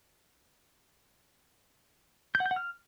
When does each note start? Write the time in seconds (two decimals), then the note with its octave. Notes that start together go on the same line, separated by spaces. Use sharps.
2.35 G6
2.40 F#5
2.46 G6
2.51 F#5
2.56 F6